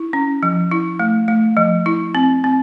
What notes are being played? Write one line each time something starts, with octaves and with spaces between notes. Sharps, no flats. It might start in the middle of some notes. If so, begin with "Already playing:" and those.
Already playing: E4
C#4
F3
E4
A3
A3
F3
E4
C4
C4